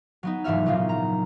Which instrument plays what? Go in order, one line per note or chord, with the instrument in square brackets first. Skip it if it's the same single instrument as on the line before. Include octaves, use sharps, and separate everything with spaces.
[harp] F#3 B3 D#4
F1 G#2 E3 F#4 E5 F6
A#2 C#3 F#3 D#4 F4
A#5